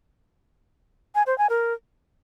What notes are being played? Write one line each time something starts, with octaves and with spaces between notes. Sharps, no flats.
G#5
C5
G#5
A#4